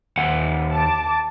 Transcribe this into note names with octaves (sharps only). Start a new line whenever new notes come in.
D#2 F#5
A5 D6